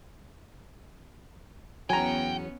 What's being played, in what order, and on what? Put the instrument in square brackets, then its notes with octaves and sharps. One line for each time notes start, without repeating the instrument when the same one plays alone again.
[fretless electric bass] E2 F#3 [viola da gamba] B3 C#4 [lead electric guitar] G5 [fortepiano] G#5 A#5